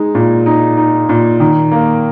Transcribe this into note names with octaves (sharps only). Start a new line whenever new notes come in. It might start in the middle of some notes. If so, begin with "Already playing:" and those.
Already playing: G#3 D#4
A#2
D#4
D#4
A#2
D#3
A#3